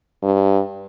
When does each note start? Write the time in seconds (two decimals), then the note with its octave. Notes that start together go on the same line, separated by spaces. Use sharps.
0.23 G2